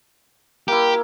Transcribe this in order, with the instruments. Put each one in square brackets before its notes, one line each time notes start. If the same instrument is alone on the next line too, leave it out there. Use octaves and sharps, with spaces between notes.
[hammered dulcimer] A#3 E4 [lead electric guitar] G4